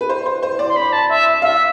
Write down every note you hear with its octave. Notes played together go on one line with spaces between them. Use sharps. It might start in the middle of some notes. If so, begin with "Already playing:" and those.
B4
C5
C5
C5
D5
C6
B5
A5
E5
E5 F5